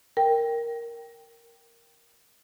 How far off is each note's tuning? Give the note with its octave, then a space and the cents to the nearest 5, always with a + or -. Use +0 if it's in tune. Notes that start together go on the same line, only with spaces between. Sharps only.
A#4 +0 G5 +0